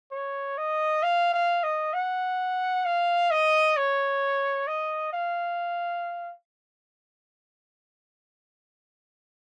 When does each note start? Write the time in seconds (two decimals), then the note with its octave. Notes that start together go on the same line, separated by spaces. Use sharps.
0.12 C#5
0.58 D#5
1.03 F5
1.34 F5
1.64 D#5
1.94 F#5
2.85 F5
3.31 D#5
3.77 C#5
4.68 D#5
5.13 F5